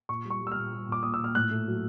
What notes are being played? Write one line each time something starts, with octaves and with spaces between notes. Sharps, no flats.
A#2 C#6
G3
C#6
G3
E6
A#2 F6
G3
A#2 D6
A#2 D#6
E6
A#2 F6
A2 F#6
A3
F#3